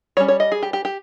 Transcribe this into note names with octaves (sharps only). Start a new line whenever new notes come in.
G3 C#4 C#5
C#5
D#5
G#4
G4
G4
G4